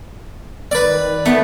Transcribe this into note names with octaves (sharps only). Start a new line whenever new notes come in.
D#3 B4 D5
A3 B3